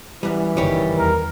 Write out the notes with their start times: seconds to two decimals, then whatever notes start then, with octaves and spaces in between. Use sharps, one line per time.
0.23 F#2 E3 G3
0.57 F#1 D#3 G3 C#5
0.98 E2 A#4